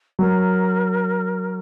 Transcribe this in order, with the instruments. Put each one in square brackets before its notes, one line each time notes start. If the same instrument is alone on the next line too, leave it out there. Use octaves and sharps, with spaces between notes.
[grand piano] F#3 [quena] A#4